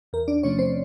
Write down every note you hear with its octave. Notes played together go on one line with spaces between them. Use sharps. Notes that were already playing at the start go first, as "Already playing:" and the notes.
E2 A#4
D4 D5
C3 F3 A3 C#4 C#5
C4 C5